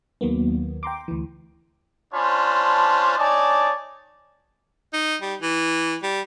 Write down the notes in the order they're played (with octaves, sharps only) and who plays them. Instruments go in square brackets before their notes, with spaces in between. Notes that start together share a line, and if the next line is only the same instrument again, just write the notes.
[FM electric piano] D#2 D#3 F#3 A#3 B3
G5 A#5 C6 D6
D2 E3
[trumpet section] C#4 D4 F4 C5 A5 B5
D#4 C#5 D5 G#5 A5
[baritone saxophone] D#4
G3
E3
G3